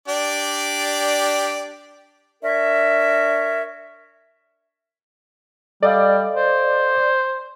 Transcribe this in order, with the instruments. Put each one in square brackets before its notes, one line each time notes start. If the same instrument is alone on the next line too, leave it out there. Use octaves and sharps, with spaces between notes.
[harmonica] D4 G4 D5
[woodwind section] D4 A#4 C#5 E5
[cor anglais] G3 [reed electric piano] A4 D#5 F5 [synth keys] D5
[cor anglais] C5